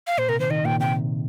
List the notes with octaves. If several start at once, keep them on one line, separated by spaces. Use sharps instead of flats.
F5
A#2 C5
C3 A#4
D#3 C5
D#3 D#5
A#2 G5
C3 G5